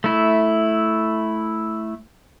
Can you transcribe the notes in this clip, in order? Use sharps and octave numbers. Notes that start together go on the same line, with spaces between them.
A3 E4